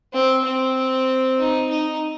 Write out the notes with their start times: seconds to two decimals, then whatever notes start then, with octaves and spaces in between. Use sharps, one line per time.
0.14 C4
0.45 C4
1.38 D#4
1.70 D#4